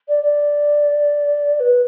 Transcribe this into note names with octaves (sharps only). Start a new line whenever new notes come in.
D5
D5
B4